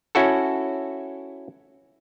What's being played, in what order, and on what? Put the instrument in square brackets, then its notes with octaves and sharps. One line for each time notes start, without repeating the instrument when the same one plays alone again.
[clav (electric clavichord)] C#4 E4 F#4 A4